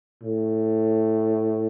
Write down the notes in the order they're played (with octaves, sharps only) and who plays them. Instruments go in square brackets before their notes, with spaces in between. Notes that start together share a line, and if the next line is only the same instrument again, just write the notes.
[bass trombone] A2